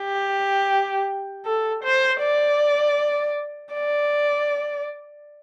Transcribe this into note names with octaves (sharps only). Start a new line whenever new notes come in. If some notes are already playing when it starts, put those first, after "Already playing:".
Already playing: G4
A4
C5
D5
D5